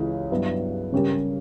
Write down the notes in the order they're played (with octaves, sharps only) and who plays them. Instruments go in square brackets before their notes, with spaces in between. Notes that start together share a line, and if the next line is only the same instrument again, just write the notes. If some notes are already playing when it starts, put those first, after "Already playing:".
Already playing: [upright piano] C#2 C#3 E3
G2 F#3 B3 E4
C#3 G3 C#4 G4 A#4